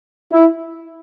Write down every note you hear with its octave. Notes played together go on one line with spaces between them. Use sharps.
E4